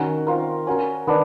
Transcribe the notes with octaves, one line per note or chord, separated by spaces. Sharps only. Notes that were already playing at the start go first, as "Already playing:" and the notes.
Already playing: D#3 C#4 F#4 A#4
C4 F4 A#4
C#4 F#4 A#4
D#3 B3 D4